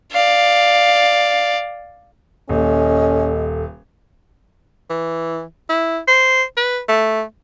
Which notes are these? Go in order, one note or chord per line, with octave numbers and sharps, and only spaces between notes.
D5 F5
D#1 C#4 A4 D#5
E3
E4
C5
B4
A3